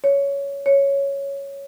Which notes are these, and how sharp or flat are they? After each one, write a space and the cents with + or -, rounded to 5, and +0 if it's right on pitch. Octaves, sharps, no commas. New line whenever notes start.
C#5 +10
C#5 +0